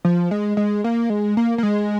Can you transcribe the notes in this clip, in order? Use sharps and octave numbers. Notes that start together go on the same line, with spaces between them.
F3
G#3
G#3
A#3
G#3
A#3
A#3
G#3